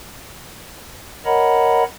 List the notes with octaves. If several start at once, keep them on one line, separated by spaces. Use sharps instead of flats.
A#4 C#5 D#5 F#5 A#5 B5